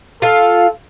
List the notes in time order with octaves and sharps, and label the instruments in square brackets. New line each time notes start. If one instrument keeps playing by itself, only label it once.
[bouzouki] F4 F5 [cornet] A4